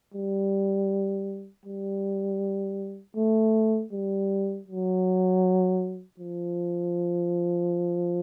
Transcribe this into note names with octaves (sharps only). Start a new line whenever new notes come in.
G3
G3
A3
G3
F#3
F3